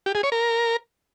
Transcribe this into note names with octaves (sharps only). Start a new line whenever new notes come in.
G4
G#4
C#5
A#4